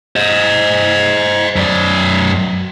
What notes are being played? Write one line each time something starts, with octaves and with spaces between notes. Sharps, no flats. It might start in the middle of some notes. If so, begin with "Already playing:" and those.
C5 D#5
F#2 D5